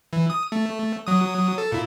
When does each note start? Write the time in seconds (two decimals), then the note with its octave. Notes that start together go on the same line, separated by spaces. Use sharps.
0.13 E3
0.30 D#6
0.52 A3
1.07 F#3 D#6
1.58 A4
1.72 A#2 E4